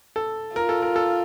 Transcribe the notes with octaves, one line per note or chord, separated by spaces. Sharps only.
A4
F4 A#4
A4
A#4
A4